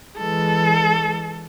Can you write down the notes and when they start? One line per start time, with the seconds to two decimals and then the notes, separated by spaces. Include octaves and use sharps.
0.17 E3 G#3 A4